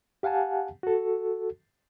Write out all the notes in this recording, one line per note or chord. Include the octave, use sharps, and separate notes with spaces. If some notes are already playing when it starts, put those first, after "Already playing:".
G4 F5 F#5 G#5 A5
F#4 A4